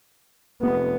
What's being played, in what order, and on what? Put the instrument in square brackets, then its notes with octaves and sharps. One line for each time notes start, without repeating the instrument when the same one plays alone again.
[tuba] F1 [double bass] B3